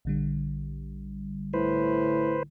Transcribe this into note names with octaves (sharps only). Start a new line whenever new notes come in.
A#1 D3 G3
A2 B4 C5